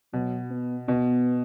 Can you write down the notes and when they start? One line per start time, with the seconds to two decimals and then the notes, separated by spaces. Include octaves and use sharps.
0.13 B2 F#3
0.51 B3
0.88 B2 B3